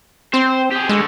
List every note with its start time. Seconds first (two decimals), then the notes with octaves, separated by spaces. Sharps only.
0.34 C4 C5
0.72 G4 G#4
0.89 D3 G#3 A3